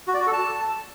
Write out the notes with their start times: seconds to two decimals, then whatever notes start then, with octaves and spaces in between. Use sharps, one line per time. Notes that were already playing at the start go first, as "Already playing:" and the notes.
0.08 F#4
0.14 D5
0.20 F#4
0.27 A4
0.33 A5